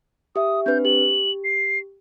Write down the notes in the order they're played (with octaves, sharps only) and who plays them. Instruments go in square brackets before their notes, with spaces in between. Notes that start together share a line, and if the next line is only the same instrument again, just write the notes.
[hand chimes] G4 E5 [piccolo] D#6
[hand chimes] C4 D4 B4 [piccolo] G6
[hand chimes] G4 [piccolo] F#7
[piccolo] C7